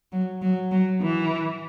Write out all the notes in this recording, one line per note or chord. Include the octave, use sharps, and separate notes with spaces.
F#3
F#3
F#3
E3